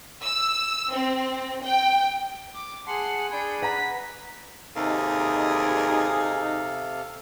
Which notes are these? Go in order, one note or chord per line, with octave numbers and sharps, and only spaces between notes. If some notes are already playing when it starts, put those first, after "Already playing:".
E6
C4
G5
D6
G#4 F#5 G#5 A5 C6
D4 G#4 G5 B5
B4 F#5 A#5 B6
D#2 C3 D#4 G#4 A4 F5